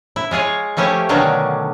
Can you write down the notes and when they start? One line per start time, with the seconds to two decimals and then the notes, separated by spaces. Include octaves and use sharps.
0.16 E4
0.31 G#3 F4 G#4 C#5
0.77 F3 A3 C#4 E4 G4
1.09 B2 D3 D#3 F#3 C#4 D4